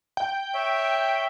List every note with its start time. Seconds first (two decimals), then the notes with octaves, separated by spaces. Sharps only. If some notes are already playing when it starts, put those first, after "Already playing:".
0.17 G5
0.54 C#5 E5